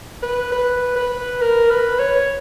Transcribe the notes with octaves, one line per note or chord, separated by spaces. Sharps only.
B4
B4
B4
A#4
B4
C#5